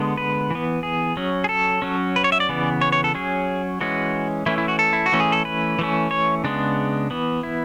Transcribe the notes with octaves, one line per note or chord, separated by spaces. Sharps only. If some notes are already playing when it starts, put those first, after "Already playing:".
Already playing: D3 G#3 B3
B4
E3 B3
G#4
F#3 C#4
G#4
A4
F#3 C#4
B4
C#5
E5
D5
C#3 E3 B3
C#5
C#5
A4
F#3 C#4 G#4
E3 G#3 C#4 F#4
E3 A3 C#4 E4
E4
F#4
A4
E4
F#4
E3 A3 C#4
G#4
A4
B4
E3 A3 C#4
C#5
C#3 G#3 B3 D4
E3 B3
E4